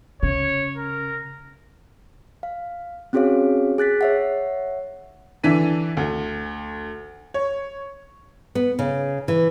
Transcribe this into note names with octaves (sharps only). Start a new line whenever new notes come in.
C#3 C#5
A#4
F5
C4 C#4 F#4 G#4 C#5 F5
G#4 F#6 A6 B6
C#5 E5 F#5
D3 E3 D4 B6 D#7
D2
C#5
B3
C#3
E3